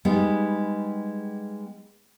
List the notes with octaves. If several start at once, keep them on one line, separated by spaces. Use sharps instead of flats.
G3 G#3 B3 D#4